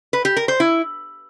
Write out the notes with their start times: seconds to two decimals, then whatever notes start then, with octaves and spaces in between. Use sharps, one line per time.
0.13 B4
0.25 G4
0.37 A#4
0.48 C5
0.60 E4